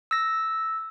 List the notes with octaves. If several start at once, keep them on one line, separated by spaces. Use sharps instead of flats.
E6 A#6